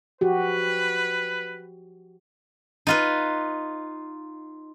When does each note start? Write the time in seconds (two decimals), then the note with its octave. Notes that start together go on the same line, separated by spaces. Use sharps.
0.21 F3 F#4 G4 B4
2.87 D#4 F4 B4